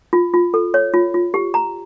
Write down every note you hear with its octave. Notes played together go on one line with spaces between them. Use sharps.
F4
F4
A4
C#5
F4
F4
G4
A#5